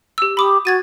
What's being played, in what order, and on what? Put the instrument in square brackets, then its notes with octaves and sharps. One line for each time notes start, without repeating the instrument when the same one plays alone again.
[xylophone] G4 E6
[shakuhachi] G4 [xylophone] B5 D6 D#6
[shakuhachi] F#4 [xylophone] G#6 A6 D#7